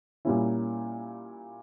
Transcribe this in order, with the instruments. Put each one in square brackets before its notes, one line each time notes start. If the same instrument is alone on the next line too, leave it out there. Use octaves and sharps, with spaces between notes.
[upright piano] A#2 G3 A#3 C#4 E4